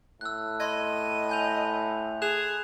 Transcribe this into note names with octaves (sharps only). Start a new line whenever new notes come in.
A2 E6 F#6
D#5 B5 C6 G#6
G#5 G6 F7
G#4 F#6 E7 F7